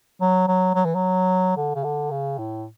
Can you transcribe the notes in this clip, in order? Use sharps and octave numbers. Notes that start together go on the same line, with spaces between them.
F#3
F#3
F#3
E3
F#3
D3
C#3
D3
C#3
A2